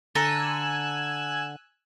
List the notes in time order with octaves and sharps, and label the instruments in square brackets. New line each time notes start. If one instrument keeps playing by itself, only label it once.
[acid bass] D3 [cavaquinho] A4 A#5 [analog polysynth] G#5 E6 F#6